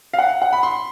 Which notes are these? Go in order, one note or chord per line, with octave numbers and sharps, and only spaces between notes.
F5
F#5
F#5
B5
C6